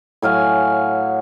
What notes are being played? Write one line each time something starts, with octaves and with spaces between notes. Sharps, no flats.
A2 F#3 F5 G#5